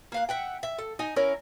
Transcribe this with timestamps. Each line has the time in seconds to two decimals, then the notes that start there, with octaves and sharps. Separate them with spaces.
0.12 A#3 F5 F#5
0.29 E5 F#5 G5
0.63 E5
0.78 A4
0.99 D#4 D#5 G#5
1.16 C#4 E4 A#4